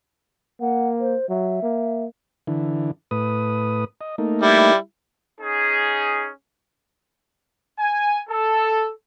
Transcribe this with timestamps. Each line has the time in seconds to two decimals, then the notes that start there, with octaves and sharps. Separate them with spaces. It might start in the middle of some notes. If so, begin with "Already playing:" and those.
0.61 A#3 F#5
0.99 C5
1.29 F#3 E5
1.63 A#3
2.47 D3 E3
3.11 A2 B4 D#6
4.01 D#5
4.18 A3 A#3 D#4
4.42 G3 E4
5.40 C#4 D#4 G#4
7.78 G#5
8.28 A4